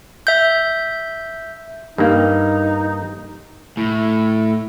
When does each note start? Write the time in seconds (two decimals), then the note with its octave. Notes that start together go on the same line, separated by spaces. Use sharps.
0.27 E5 G6
1.98 G2 A#3 D#4
3.77 A2